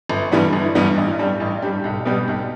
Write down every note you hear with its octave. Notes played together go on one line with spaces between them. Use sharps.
G1
G2 E3 G3 B3
G1
G2 E3 G3 B3
A1
G2 G3 D4 G4
A1
G2 G3 D4 G4
B1
B2 G3 B3 G4
B1